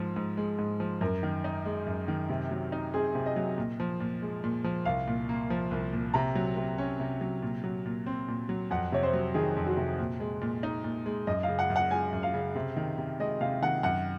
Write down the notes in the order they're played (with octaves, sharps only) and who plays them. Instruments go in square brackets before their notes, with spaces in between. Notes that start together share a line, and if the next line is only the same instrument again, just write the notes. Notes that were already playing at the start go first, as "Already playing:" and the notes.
Already playing: [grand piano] G#2 F3
G#2
G#3
G#2
F3
[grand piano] F#2 [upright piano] A#4
[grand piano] D#3
D#4
G#3
F#2
D#3
C3
F#3
D#4
[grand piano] C4 [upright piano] G#4
[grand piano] C3
[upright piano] D#5
[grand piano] F#3
A#2
F3
A#2
G#3
A#2
F3
[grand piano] C2 [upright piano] F5
[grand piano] A#2
A#3
F3
C2
A#2
[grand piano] C3 [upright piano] A#5
[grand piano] F#3
C3
C#4
C3
F#3
A#2
F#3
A#2
C4
A#2
F#3
[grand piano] F2 [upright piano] F#5
[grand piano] C3 [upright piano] C#5
[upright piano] C5
[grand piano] F#3
[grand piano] D#3 [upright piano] G#4
[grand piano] F2
[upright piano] F#4
[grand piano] C3
A#2
G#3
A#2
D#4
A#2
G#3
[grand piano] F#2 [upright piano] D#5
[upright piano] F5
[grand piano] C#3
[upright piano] F#5
[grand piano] F#2
[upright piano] F#5
[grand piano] G#3 [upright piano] G#5
[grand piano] F#2
[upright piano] F5
[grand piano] C#3
C3
D#3
C3
[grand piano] G#3 [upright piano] D#5
[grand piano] C3 [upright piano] F5
[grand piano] D#3 [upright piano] F#5
[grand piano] F#2 [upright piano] F#5